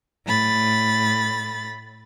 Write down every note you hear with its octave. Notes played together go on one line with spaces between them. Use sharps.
A2 B5 A6